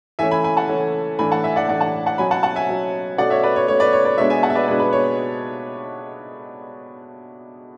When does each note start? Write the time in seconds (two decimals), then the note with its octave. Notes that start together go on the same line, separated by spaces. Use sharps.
0.19 E3 A3 C#4 E5 G#5
0.31 G#5 B5
0.44 G#5 B5
0.57 F#5 A5
0.69 E3 A3 C#4
1.19 A2 E3 A3 D4 G#5 B5
1.31 F#5 A5
1.44 E5 G#5
1.56 D5 F#5
1.68 A2 E3 A3 D4 D5 F#5
1.81 F#5 A5
2.06 F#5 A5
2.18 B2 F#3 C#4 G#5 B5
2.31 F#5 A5
2.43 F#5 A5
2.56 E5 G#5
2.69 B2 F#3 C#4
3.18 B2 A3 C#4 D5 F#5
3.30 C#5 E5
3.43 B4 D5
3.56 C#5
3.68 B2 A3 C#4 C#5
3.80 B4 D5
3.93 C#5
4.05 B4 D5
4.18 B2 G#3 B3 D4 C#5 E5
4.30 E5 G#5
4.43 F#5 A5
4.50 E5
4.55 B4 D5
4.68 B2 G#3 B3 D4 B4
4.80 B4
4.92 C#5